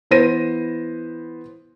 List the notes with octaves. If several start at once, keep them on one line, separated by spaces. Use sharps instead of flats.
E3 B3 B4 C5 A#6 D#7